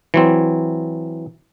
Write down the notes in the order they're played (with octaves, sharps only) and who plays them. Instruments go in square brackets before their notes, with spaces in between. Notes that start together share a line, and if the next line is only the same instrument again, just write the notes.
[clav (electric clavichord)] E3 F#3 C4